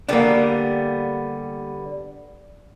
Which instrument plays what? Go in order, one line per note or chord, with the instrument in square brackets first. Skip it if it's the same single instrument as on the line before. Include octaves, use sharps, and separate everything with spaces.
[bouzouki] D3 G3 B3 [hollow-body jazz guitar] A#3 D4